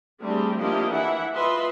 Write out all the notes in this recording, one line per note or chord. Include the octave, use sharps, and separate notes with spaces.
G3 A3 C4 D4 G4 G#4
F3 A#3 D4 E4 G4 D#5
E3 E4 E5 F#5
F4 B4 D#5 E5 C6